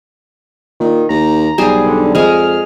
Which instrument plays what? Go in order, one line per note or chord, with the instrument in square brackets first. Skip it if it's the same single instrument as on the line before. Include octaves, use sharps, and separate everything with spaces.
[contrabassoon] A#2 [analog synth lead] D#3
[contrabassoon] D#2 [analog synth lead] A#5
[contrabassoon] B1 [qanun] G3 G#4 C5
[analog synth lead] D3
[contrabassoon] F2 [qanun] G#3 G#4 [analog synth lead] F6